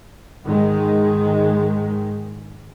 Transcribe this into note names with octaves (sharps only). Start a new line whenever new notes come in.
G#2 D#3 G#3